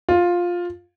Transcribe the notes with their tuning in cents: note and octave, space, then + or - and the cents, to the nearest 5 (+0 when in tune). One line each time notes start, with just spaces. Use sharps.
F4 +10